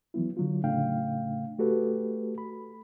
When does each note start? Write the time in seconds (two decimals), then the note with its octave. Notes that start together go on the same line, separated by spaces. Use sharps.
0.14 E3 F#3 B3 E4
0.37 D3 F#3 F4
0.64 A2 C#3 A3 D4 F5 G5
1.59 A3 F#4 G4 A4 B4
2.38 B5